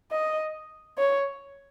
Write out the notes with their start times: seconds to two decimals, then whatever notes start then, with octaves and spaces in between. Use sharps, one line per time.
0.11 D#5
0.98 C#5